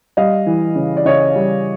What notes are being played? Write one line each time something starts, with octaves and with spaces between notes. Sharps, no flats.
G3 D#5 F5
E3
C#3
D5
C#3 C#5 D#5
G3